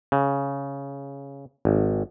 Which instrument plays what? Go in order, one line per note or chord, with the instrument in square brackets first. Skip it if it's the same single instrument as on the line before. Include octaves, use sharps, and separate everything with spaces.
[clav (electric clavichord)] C#3
G#1